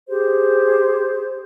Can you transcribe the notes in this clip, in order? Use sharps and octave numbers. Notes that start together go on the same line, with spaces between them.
G4 G#4 C5